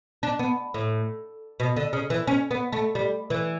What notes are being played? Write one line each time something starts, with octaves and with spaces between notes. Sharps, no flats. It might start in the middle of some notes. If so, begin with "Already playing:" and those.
D4
B3
A2
B2
D3
C#3
E3
C#4
B3
A3
G3
E3